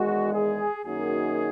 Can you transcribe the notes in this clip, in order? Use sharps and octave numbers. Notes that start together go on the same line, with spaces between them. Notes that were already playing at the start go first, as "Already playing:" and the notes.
Already playing: E2 D#3 G#3 F#4
G#4
F#2 D#3 A#3 D#4 F#4 G#4